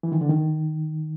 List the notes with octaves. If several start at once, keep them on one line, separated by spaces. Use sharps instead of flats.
E3
D#3
D3
D#3